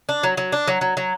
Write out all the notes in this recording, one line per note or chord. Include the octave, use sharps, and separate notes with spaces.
D4
F#3
F#3
D4
F#3
F#3
F#3